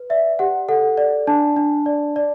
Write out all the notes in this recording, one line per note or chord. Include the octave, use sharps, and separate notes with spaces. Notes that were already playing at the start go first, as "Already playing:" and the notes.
Already playing: B4
D5 E5
G4 F#5
A4 F#5
D5
D4 A5
D4
D5
D5